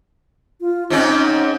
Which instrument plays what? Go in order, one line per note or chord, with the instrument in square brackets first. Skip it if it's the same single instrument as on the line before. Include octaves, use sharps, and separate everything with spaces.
[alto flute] F4
[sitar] G#2 C4 C#4 [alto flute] D#4